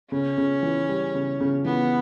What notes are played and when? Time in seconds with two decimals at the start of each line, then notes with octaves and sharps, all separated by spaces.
0.12 C#3 C#4
0.38 C#3
0.63 E3
0.89 G3
1.15 C#3
1.40 C#3
1.65 E3 B3